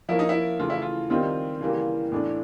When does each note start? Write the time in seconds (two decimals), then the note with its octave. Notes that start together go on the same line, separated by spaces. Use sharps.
0.09 F3 A#3 C#4 E4
0.19 D#4
0.29 E4
0.59 C#3 E3 A3 F4
0.70 E4
0.82 F4
1.10 D#3 G3 C4 D#4 F4
1.61 C#3 E3 G3 A#3
2.12 A2 E3 A3 D4